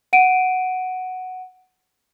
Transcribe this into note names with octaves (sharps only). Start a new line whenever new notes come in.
F#5 D7 D#7